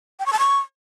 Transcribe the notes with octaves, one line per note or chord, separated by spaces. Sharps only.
G5
C#6
A5
C#6